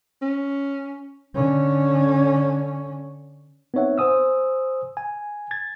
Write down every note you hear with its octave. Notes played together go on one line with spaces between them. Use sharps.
C#4
D3 C#4
B3 C4 D#4 C#5 E5 F#5
C5 G#5 D#6 E6
G#5
G#6 A6